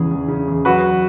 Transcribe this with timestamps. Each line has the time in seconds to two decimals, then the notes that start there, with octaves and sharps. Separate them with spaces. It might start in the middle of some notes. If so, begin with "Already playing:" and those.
Already playing: E2 C#3 E3 G#4
0.11 E2
0.28 C#3
0.48 E2
0.65 F#3 F#4 B4